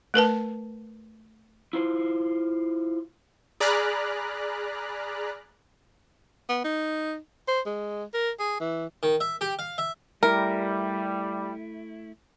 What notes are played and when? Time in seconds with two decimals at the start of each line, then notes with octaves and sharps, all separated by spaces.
0.14 A3 A#4 B4 A5
1.73 E4 F4 C5
3.60 G#4 D5 A#5 B5 F6 F#6
6.49 B3
6.64 D#4
7.48 C5
7.66 G#3
8.14 A#4
8.39 G#4
8.60 E3
9.03 D#3
9.21 E5
9.41 G4
9.59 F5
9.78 E5
10.23 G3 A3 E4 A#4